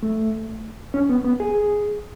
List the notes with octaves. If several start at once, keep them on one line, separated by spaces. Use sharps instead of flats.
A3
C#4
B3
B3
G#4